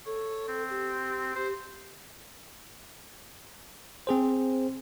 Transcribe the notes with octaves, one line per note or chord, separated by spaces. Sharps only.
A4 C#5
C4
G4
G4 C5
C4 G#4 C5